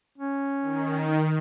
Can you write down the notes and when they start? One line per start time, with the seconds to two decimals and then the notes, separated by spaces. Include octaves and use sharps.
0.18 C#4
0.62 D#3